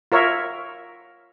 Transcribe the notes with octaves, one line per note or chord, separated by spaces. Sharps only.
F4 A#4 C#5 E5